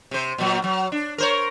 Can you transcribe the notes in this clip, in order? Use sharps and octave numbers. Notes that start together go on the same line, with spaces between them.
C3 C5
A#2 F#3
F#3
D4
A#4 C5 C#5